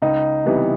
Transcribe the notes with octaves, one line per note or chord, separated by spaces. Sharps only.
C#2 D#4
C3 E3 G3 B3